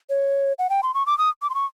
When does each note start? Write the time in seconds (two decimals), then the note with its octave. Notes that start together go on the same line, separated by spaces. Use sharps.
0.10 C#5
0.59 F#5
0.70 G5
0.83 C6
0.94 C#6
1.06 D6
1.18 D#6
1.42 D6
1.50 C6
1.55 C#6